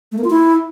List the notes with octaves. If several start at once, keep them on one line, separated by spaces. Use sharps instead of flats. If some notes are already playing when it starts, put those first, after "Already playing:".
A3
A#3
F4
E4